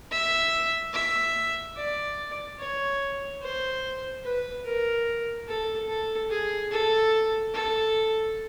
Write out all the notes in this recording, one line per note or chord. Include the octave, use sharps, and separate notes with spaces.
E5
E5
D5
C#5
C5
B4
A#4
A4
A4
G#4
A4
A4